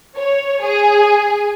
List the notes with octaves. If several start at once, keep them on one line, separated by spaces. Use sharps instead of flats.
C#5
G#4